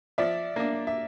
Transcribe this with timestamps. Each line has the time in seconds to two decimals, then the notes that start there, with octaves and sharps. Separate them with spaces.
0.18 F3 D5 E5
0.56 A#3 D4
0.87 E5